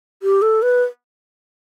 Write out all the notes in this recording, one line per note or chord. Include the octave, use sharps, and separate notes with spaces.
G4
A4
B4